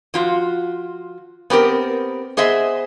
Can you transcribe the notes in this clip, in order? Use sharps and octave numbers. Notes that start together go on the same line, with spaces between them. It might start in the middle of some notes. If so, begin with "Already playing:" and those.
F3 F4 F#4
B3 C4 G4 A#4
B3 G#4 C5 D#5 E5